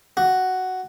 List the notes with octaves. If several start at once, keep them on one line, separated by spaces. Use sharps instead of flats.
F#4